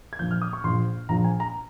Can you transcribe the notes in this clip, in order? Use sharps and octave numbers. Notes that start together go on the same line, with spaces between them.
G#6
A#1 A#2 F3 G6
F6
D#6
C#6
A#1 A#2 F3 C6
A#1 A#2 F3 A#5
G#5
A#5